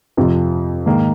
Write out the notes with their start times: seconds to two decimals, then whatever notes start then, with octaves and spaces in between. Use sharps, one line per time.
0.17 F2 C3 F3
0.86 G#2 D#3 A#3